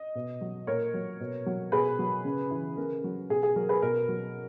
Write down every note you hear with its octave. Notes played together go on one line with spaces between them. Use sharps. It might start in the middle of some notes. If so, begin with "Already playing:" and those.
Already playing: D#5
B2
F#3
A#2 A#4 C#5
F#3
B2
F#3
B2 G#4 B4
F#3
C#3
E3
C#3 A#4
F#3
B2 G#4
G#4
F#3 A#4
G#4 B4
B2 A#4
F#3